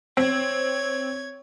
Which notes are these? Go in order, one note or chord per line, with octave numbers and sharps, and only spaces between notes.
C4 C#5 G#6